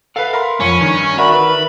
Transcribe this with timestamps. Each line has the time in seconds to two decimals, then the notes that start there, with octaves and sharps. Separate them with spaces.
0.16 A4 B4 F5 F#5
0.33 A#4 B5 C6
0.61 F2 C#4 B5
0.81 G2 D#3
1.18 F#4 A#4 D5 E5 B5
1.34 B4